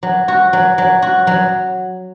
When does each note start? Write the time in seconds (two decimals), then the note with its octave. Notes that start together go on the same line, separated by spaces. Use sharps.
0.03 F#3
0.28 F#4
0.53 F#3
0.78 F#3
1.02 F#4
1.27 F#3